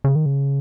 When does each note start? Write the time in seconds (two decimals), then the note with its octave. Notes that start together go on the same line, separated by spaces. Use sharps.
0.04 C#3
0.15 D#3
0.26 C#3